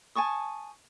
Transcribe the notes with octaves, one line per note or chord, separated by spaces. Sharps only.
G#5 A5 C#6 D#6